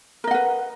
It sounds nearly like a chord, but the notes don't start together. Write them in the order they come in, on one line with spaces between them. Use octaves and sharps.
A#4 D#5 F#5 B4